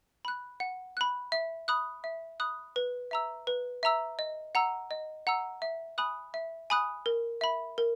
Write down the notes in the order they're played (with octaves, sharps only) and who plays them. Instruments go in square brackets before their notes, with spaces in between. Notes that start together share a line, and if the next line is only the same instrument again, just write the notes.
[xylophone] B5 F#6
F#5
B5 F#6
E5
B5 D#6 F#6
E5
B5 D#6 F#6
B4
E5 A#5 E6
B4
E5 A#5 E6
D#5
F#5 A#5 E6
D#5
F#5 A#5 E6
E5
G#5 B5 D#6 F#6
E5
G#5 B5 D#6 F#6
A#4
E5 B5
A#4